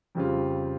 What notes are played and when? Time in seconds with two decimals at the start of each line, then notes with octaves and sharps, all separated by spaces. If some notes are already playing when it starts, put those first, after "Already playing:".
0.15 F2 C#3 G3 C4 F4